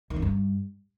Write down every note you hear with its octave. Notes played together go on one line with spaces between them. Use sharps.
D#3
F#2
G2